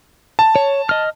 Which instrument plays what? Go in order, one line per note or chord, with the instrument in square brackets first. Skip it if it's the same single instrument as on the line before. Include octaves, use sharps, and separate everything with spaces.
[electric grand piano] A5
[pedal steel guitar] C#5
D#5 F6